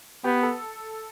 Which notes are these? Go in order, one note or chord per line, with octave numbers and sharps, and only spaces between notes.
B3 G4
A4